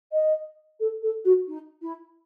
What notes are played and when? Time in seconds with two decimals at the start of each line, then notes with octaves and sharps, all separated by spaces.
0.12 D#5
0.80 A4
1.02 A4
1.24 F#4
1.47 D#4
1.81 E4